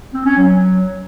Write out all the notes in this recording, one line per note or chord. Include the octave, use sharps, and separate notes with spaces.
C4
C#4
F#3